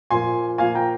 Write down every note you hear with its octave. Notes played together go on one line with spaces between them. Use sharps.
A#2 F3 A#3 G#5 C6
A#2 F3 A#3 F5 G#5
G5 A#5